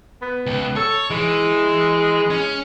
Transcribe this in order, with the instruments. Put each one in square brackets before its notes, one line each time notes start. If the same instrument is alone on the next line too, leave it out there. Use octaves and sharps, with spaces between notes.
[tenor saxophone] B3
[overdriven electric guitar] C#2
[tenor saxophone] A4 [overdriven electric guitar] C#5
[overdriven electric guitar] E3 [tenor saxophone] G#3
[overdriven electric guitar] C#4